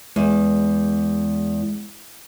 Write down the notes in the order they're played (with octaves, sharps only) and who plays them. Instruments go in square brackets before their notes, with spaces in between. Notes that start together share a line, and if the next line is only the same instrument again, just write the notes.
[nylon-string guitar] E2 [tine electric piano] G#3